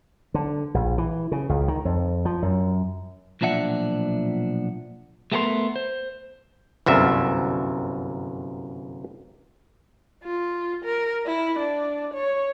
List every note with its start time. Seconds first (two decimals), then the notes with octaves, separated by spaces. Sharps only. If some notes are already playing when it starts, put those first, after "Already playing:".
0.34 D3
0.74 A#1
0.98 E3
1.32 C#3
1.49 C#2
1.68 D#3
1.85 F2
2.25 F3
2.42 F#2
3.41 B1 A#2 F3 D4 E5 F#5
5.32 G#3 A3 B3 G#4 A#4 C6
5.76 C5
6.86 G1 C2 F#2 E5
10.24 F4
10.84 A#4
11.26 E4
11.59 D4
12.14 C#5